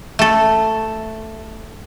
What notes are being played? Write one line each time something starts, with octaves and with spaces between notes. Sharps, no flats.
A3 A4